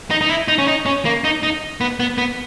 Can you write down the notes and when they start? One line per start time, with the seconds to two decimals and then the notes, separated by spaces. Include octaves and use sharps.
0.11 D#4
0.21 D#4
0.29 E4
0.48 D#4
0.58 C#4
0.68 D#4
0.86 C#4
1.05 A#3
1.24 D#4
1.43 D#4
1.81 B3
2.00 B3
2.18 B3